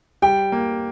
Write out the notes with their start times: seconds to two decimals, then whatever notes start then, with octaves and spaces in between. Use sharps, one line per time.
0.22 G3 G5
0.52 A#3